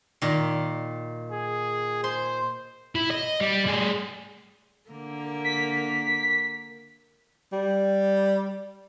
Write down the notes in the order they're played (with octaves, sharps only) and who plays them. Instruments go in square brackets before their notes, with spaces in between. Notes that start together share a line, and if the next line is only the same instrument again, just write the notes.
[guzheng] A#2 D#3
[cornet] G#4
[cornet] C5 [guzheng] C6
[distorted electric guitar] E4
D#5
G3
G3 G#4
[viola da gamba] D3 A#3 A#4
[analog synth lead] B6
[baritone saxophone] G3